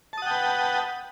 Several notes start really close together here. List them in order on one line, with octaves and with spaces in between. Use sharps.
A5 D#6 F#5 G5 B4